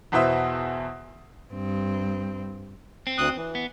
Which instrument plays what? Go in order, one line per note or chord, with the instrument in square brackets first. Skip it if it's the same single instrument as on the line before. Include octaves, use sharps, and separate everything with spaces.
[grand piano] E2 B2 E3 C5 E5 D#6
[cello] G2 C4
[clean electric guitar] C4
[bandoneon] D2 D#6 F#6
E3
[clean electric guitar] B3